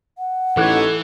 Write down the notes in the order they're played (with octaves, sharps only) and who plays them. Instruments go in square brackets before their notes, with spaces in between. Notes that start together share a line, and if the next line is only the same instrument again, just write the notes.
[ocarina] F#5
[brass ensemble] A1 D#4 C#5 [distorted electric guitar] E3 [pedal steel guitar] A4 D6 F#6